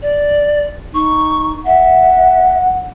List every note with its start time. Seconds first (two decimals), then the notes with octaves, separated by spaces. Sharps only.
0.02 D5
0.94 D#4 C#6
1.65 E5 F#5